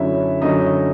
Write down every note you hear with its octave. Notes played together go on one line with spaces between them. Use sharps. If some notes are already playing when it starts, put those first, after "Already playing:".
Already playing: F#2 D3 F#3 E4 E5
F#2 D3 F#3 D#4 D#5